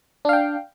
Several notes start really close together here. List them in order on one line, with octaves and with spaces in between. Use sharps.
D4 F5 G5